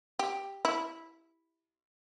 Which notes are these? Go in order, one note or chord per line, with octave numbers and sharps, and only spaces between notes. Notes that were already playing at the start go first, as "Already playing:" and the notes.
G4
E4